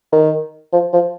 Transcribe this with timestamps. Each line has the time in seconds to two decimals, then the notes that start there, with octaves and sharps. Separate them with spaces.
0.12 D#3
0.73 F3
0.93 F3